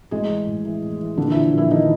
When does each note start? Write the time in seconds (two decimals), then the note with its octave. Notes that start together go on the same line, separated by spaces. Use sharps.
0.11 A2 G#3 G#4
0.29 E3
0.47 A2
0.65 E3
0.83 A2
1.01 E3
1.17 A#2 D3 D4
1.31 E3 F3 E4
1.53 A#2 E3 E4
1.71 D#3 F3 D#4